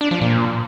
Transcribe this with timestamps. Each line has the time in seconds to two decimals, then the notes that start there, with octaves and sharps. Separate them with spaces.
0.01 D4
0.11 F3
0.21 A#2